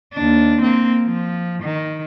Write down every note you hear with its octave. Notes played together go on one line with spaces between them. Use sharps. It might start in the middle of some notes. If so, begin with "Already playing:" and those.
D#2 D4
A#3 C4
F3
D#3